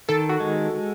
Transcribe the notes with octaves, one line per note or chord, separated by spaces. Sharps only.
D#3 A4
F#4
G#3